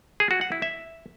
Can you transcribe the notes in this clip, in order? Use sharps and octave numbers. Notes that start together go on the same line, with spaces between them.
G#4
F#4
F#5
E4
E5